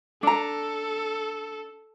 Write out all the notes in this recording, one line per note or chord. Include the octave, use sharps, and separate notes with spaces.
D4 A4 A#5